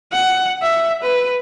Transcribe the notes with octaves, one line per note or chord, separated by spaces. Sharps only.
F#5
E5
B4